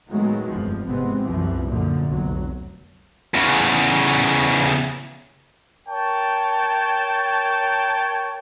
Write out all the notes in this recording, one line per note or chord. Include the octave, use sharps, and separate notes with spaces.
A2 D#3 F#3 G#3 A3 B3
F1 G2 F3
G#1 C3 G#3 B3 C4
C2 F#2 E3 F3
F#2 A#2 D3 F3
F1 B1 F#3
E2 C#3
A#4 C#5 G5 A5